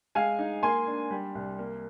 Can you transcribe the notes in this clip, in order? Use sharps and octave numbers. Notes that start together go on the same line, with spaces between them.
G#3 F5 G#5
D#4
A#3 G#5 C6
D4
G3
C2
A#3